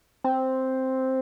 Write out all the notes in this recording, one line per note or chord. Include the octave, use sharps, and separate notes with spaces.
C4